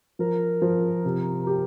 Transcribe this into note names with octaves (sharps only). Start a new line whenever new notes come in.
F3 A#4
F3
C3
G4